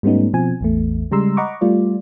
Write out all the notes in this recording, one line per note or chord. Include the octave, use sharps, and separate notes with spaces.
G#2 G3 A3 B3 C#4 D#4
B2 F3 C4 G#5
A1 E2 A3
C#3 G3 G#3 A#5 C6 E6
D#5 F#5 A#5 B5 C#6 D6
G3 A3 F4 D5